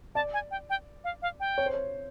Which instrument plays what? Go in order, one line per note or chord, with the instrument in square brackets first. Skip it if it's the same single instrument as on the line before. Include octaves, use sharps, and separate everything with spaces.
[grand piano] D5 [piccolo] A5
[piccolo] G#5
G5
G5
F5
F5
G5
[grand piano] C#5
C5
C#5